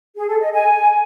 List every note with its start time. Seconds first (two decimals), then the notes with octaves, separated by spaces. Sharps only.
0.17 G#4
0.29 A4
0.41 D#5
0.53 G#5